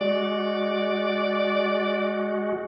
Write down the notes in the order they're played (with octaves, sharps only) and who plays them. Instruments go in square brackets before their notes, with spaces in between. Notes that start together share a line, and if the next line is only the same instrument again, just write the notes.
[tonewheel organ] G#3 F#4 [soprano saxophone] D5